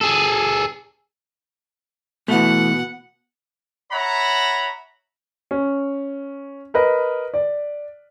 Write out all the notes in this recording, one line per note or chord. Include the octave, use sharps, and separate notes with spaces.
G#4 A4
B2 E3 A3 F#5
C#5 E5 F#5 A#5 B5
C#4
A#4 B4 D#5
D5